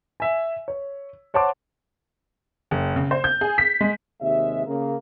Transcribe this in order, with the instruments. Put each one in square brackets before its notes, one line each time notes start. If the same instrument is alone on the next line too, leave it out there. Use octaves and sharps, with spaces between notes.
[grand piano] E5 G#5
C#5
C5 C#5 F#5 A5 C6 D6
[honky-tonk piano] F#1
C#3
C5
G6
G#4
B6
G#3
[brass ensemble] D#2 C3 G#3 E5
C#3 A#3